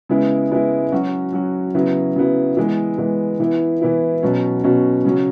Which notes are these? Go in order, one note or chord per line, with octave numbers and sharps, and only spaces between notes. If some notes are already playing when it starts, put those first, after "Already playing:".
C#3 G#3 B3 E4
C#3 G#3 B3 E4
F#3 C#4 F#4
F#3 C#4 F#4
C#3 F#3 B3 E4
C#3 F#3 B3 E4
E3 G#3 B3
E3 G#3 B3
E3 B3 E4
E3 B3 E4
B2 F#3 C#4
B2 F#3 C#4
C#3 F#3 C#4